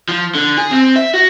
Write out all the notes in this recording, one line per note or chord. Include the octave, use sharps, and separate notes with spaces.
F3
D3
G#4
C4
E5
F#4